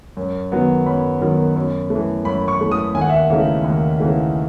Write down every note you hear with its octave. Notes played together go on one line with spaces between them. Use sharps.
F#2
D#3 F#3 B3
F#2 B5
D#3 F#3 B3
F#2
A3
E3
F#2 B5
C#6
E3 A3
D#6
D#2 G#5
F#5
E5
F#5
C#3 E3 A3 D#4
D#2
C#3 E3 A3 D#4